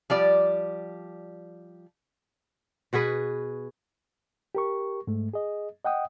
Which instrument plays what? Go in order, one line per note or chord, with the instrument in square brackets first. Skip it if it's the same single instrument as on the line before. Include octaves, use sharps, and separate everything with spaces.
[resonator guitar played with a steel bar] F3 G3 D5
[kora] B2 F#4 G#4 B4
[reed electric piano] G4 A#4 C#6
G#2 A3
G#4 D#5
D#5 F#5 G5 D#6